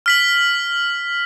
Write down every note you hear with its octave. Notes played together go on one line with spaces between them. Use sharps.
F6 B6 F#7